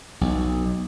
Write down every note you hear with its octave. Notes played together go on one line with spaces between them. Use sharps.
B1